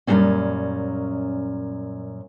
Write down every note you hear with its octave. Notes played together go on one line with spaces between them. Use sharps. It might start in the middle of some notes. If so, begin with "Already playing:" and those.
F#2 A#2 F3 G3 C4 C#4